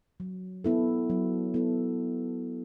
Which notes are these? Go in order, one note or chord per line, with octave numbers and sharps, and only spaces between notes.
F#3
B3 E4 A4
F#3
B3 E4 A4